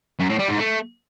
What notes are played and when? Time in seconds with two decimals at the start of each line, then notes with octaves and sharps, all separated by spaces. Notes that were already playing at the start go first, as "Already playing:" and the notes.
0.20 F#2
0.30 A2
0.39 G3
0.49 G#2
0.59 A3